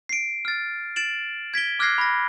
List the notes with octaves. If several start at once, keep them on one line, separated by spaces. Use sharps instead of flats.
C7 D7
F6 A6
A6 D7 E7 F#7
G#6 B6 D7 G7
D6 F6 F#6 G#6 A#6 C7
B5 A#6